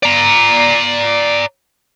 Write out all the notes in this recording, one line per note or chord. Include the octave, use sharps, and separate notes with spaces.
D5 A#5